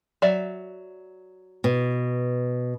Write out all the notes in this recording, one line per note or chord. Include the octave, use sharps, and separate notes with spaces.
F#3 D5 E5
B2